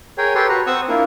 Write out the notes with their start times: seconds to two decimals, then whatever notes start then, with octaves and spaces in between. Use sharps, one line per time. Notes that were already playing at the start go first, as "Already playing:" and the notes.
0.18 G#4 A#4 C#5 G5
0.35 G4 A4 B4 C#5 G5 C6
0.49 F#4 B4 A#5
0.67 C4 F#5 C#6 D#6 E6
0.89 A#3 D4 E4 F4 A#4